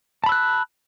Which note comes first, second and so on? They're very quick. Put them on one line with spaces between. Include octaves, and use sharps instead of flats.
A5 B5 E6 F#6